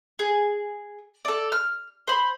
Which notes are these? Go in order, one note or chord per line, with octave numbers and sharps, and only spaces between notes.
G#4
A4 D5
F6
C5 B5